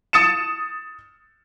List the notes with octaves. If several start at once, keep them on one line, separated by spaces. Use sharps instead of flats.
D#6 A6 C#7 E7